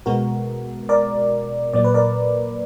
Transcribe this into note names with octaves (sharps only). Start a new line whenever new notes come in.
B2 G#3 B3 F#4 A#4
A#4 D5
A#2 F#3 A#3 D5
B4
A#4 D5